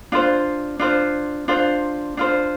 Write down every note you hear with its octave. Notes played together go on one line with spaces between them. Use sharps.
D4 F4 C5
D4 F4 C5
D4 F4 C5
D4 F4 C5